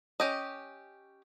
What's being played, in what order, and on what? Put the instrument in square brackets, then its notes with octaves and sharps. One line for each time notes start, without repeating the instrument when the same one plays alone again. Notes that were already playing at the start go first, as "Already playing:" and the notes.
[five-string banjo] C#4 G4 D#5